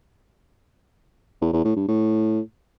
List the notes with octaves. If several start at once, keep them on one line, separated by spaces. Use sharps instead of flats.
E2
E2
A2
G2
A2